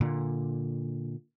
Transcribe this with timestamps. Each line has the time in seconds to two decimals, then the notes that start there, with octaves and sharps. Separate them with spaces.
0.01 A#2 D3